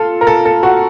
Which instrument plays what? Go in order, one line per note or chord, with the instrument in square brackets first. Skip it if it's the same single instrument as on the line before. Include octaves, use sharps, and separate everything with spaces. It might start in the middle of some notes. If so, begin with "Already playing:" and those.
Already playing: [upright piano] F4 A4
A#4
A4
A4
F#4